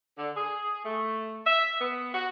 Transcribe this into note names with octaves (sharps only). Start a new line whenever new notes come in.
D3
G#4
A3
E5
B3
F#4